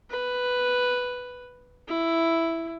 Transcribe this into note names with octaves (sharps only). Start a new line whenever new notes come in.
B4
E4